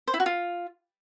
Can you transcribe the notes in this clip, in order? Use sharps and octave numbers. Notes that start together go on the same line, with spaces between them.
C5
E4
F#4
F4